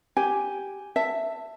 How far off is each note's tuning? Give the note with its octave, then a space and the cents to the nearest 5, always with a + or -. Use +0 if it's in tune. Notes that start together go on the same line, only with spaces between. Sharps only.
G4 +0 G#5 +0
E5 +5 A5 +15